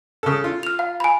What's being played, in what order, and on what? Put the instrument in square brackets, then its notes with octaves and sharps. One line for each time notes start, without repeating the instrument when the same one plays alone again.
[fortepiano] C#3 A4
F4
[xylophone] F6 F7
F5
G#5 B5